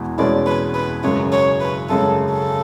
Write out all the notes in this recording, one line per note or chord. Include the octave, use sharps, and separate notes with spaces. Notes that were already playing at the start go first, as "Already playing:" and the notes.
Already playing: E2 B2 G#3 E4
E2 B2 G#3 C#4 E4 D5
B4
B4
F#2 C#3 G#3 C#5
C#5
B4
F#2 C#3 G#3 A4
A4